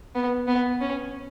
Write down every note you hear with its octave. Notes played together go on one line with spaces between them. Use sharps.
B3
B3
C#4